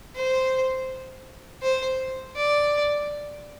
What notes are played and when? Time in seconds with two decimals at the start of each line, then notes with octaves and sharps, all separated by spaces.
0.15 C5
1.62 C5
2.36 D5